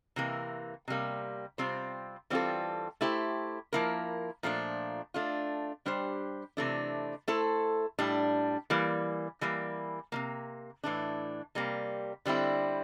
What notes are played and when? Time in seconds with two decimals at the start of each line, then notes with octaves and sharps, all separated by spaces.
0.16 C3 E3 A#3
0.88 C3 G3 A#3
1.58 C3 G3 C4 F4 C5
2.30 E3 G3 C4 F4 A4
3.01 A3 E4 G4 C5
3.73 F3 A#3 E4 A#4
4.43 A#2 F3 A3 D4
5.14 A3 D4 F4
5.86 G3 D4 G4 C5
6.57 C3 E3 A3 D4
7.28 A3 E4 A4 C5
7.99 A2 G3 D4
8.70 E3 G3 A#3
9.41 E3 G3 A#3
10.12 C3 F3 A#3
10.84 A2 E3 A3 D4
11.55 C3 G3 A#3
12.25 D3 G3 C4 E4